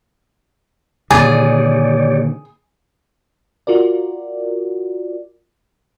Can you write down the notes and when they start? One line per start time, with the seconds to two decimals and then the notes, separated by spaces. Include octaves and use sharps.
1.11 A#2 D3 D#3 G4 G#4 C#5 D5 G#5
3.67 F4 F#4 A#4 D5